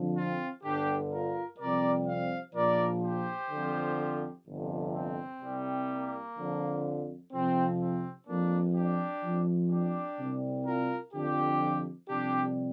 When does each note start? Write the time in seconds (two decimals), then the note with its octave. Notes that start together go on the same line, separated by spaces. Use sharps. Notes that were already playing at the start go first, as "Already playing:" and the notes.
Already playing: F2 D3 F3
0.16 C4 F4
0.63 G1 G2 D3 D4 G4
1.11 F4 A#4
1.59 F2 C3 G3 A#4 D5
2.06 C5 F5
2.54 A#1 A#2 F3 A#4 D5
3.02 G4 C5
3.50 F2 D3 F3
4.45 G1 F2 C3
4.93 C4
5.41 C2 C3 G3
5.88 A#3
6.36 F2 D3 F3
7.31 F2 C3 F3 C4
7.79 C4
8.27 F2 F3 A#3 D4
8.74 D4 G4
9.22 F2 F3
9.70 D4 G4
10.17 C2 C3 G3
10.65 F4 A#4
11.13 F2 D3 F3 D4 G4
12.08 F2 C3 G3 D4 G4